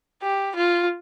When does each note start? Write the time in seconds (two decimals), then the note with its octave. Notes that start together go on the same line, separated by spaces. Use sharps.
0.22 G4
0.55 F4